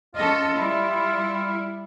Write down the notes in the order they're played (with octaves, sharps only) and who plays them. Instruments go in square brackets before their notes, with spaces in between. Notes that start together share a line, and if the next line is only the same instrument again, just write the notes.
[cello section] C#4 A4 D#5 [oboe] F4
[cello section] G3 E4